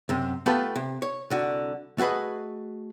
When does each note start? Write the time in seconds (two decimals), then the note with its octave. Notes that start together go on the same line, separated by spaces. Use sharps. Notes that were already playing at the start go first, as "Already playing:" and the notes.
0.09 F#2 C3
0.46 A3 B3 F4 G4 A4 B4
0.76 C3
1.02 C#5
1.30 C2 D3 F#4
1.98 A3 F#4 G#4 B4 D#5